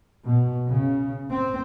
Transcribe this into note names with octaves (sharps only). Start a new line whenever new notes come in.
B2
C#3
C4